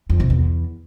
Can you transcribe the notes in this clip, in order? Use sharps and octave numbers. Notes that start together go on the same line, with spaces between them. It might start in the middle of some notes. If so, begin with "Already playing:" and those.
F2
C3
E2